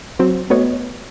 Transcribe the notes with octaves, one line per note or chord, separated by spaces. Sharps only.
F#3 C4
A3 B3 F#4 C#5 D#5